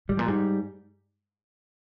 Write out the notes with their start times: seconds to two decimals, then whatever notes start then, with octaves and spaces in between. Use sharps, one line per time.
0.09 G#2 G3
0.17 A#2 F3
0.26 G#2 G3